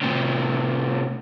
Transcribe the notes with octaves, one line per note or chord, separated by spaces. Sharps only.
A2 C3